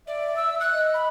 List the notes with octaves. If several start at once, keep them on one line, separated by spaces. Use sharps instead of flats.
D5 E5
E6
F#6
D#5
B5